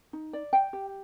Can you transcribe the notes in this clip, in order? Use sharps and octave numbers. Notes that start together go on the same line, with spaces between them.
D#4
D5
G5
G4